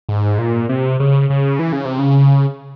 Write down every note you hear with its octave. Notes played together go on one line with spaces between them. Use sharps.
G#2
A#2
C3
C#3
C#3
E3
C#3
C3
C#3